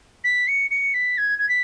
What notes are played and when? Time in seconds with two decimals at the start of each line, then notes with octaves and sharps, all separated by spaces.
0.24 B6
0.47 C#7
0.70 C#7
0.94 B6
1.18 G#6
1.39 G#6
1.49 B6